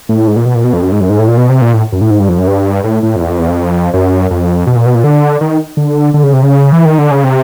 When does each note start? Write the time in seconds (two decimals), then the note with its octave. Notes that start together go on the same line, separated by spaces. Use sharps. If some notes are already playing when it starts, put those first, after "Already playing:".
0.09 A2
0.27 G#2
0.36 A#2
0.46 B2
0.55 A#2
0.64 B2
0.73 F2
0.82 F#2
0.92 G#2
1.01 F#2
1.10 G#2
1.19 A2
1.28 A#2
1.37 B2
1.49 C3
1.61 A#2
1.74 A2
1.92 F#2
2.01 A2
2.10 G#2
2.20 G2
2.29 F2
2.38 F#2
2.47 G2
2.84 A2
3.03 A2
3.16 F2
3.21 E2
3.30 F2
3.39 E2
3.48 F2
3.94 F#2
4.31 F2
4.67 B2
4.76 A#2
4.86 B2
4.95 A#2
5.04 D3
5.41 D#3
5.77 D3
6.14 D3
6.23 C#3
6.33 C3
6.43 C#3
6.72 E3
6.85 D#3
6.98 D3
7.11 C#3
7.24 C3